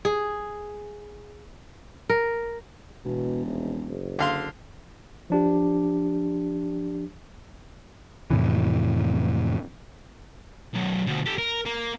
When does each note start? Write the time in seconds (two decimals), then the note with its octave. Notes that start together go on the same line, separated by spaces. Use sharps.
0.05 G#4
2.09 A#4
3.05 E1 B2
3.47 D#1
3.86 F#1
4.19 D3 F5 C6
5.30 F3 D4 G4
8.30 F2 A2 C3 E3
10.74 B1 F#2
11.07 D2 B2
11.26 G4 A4
11.38 A#4
11.66 A#3